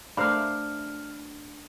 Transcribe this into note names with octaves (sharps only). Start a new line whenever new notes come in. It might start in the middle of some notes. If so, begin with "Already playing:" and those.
A3 D4 A#4 C5 F5 B5 F6